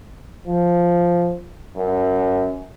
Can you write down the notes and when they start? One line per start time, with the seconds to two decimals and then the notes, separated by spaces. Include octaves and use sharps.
0.47 F3
1.76 F#2